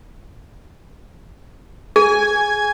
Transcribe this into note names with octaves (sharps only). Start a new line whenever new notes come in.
G#4 G#5